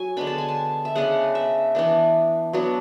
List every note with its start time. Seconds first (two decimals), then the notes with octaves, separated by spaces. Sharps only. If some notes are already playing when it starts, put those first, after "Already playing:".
Already playing: F#3 G#5
0.17 D3 G#3 B3 D4 B5
0.27 A5
0.38 G#5
0.49 A5
0.85 E5
0.95 C#3 G#3 B3 D4 F#5
1.35 E5
1.75 E3 B3 D4
2.53 F#3 B3 D4